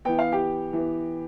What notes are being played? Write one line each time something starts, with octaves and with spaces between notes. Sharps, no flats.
E3 B3 G5
F5
G4 G5
E3 B3